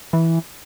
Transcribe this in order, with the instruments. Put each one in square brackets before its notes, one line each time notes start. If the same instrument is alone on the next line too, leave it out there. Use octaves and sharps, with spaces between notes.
[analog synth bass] E3